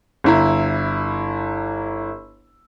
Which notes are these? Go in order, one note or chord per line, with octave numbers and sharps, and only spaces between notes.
G1 E4 A#5